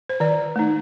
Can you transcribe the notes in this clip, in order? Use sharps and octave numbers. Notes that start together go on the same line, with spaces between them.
C5
D#3 D5
A3 D#4